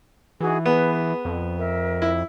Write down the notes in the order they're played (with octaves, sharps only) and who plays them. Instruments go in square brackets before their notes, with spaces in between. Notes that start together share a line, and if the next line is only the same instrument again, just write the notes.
[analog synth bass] E3 [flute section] D#4 F#4 G#4
[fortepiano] B3 [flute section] G#4 B4
[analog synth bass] F2
[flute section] A#4 E5
[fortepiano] E4